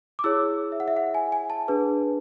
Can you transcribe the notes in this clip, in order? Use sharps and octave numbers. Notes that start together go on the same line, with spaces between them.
D6
E4 G#4 C#5 E6
E5
F#5
E5
F#5
G#5
G#5
A5
D4 G#4 B4